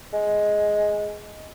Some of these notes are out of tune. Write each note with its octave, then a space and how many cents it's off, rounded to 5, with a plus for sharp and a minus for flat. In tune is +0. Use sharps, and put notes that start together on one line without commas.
G#3 +5